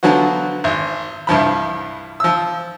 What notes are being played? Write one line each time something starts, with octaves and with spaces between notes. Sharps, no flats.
D3 F3 F#3 B3 F#4
G#1
C2 G2 F3 B5
F3 E6